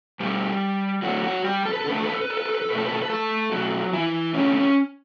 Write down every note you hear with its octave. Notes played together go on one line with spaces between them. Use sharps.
B2 G3 A3 G4
D3 F#3 A3 F#4
F#3 F#4
G3 G4
A4
B4
A4
D3 A3 B4
A4
B4
A4
B4
A4
B4
A4
B4
A4
B2 A3 B4
A4
B4
A4
B4
A3 A4
B2 F#3 A3 F#4
E3 E4
D3 A3 C#4
C#4